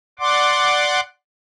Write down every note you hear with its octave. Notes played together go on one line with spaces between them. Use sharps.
D5 F#5 C6 D6